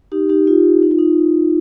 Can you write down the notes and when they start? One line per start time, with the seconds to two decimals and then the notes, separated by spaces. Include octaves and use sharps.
0.12 D#4 G4
0.29 D#4 G4
0.47 F4
0.83 D#4
0.91 F4
0.98 D#4